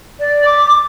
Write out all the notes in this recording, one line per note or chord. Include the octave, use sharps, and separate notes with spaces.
D5
D6